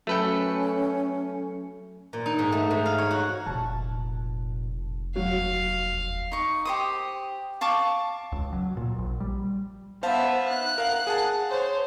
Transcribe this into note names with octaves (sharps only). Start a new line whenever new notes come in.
F#3 A3 C#4 A4 B4 G5 C#7
A#2
D#4
G#2
A3
G#2
F5
C#5
F#4
F1 A#2 A5
D#2 F#3 F5
D#4 C#6
G4 C5 D#6
F5 A5 C#6 D6
C#2
F#3
A#2
A#1
G3
B3 C5 E5 F5 A5
F#6
A#4 F5 F#5
G#4 F#5 A5
C5 C#5